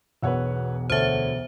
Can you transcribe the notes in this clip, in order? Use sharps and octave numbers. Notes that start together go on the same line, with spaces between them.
E1 B1 B4 C#5 F#5 E6
D2 A4 C5 C#5 E5